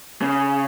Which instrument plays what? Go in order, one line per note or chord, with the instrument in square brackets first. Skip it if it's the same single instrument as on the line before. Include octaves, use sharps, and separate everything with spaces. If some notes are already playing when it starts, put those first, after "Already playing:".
[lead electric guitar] C#3